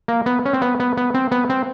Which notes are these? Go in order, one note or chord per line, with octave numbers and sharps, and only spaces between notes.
A#3
B3
C#4
C4
B3
B3
B3
C4
B3
C4